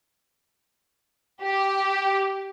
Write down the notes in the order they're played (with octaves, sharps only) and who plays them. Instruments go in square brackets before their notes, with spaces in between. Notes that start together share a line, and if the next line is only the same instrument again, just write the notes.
[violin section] G4